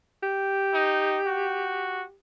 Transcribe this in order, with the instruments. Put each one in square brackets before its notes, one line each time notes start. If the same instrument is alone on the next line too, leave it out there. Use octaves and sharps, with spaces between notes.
[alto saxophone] G4
[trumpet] D#4
F#4